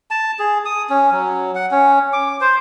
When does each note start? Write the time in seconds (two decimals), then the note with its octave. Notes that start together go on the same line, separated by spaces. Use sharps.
0.11 A5
0.39 G#4
0.65 D#6
0.90 C#4
1.11 F#3
1.55 F#5
1.71 C#4
2.13 D6
2.41 C5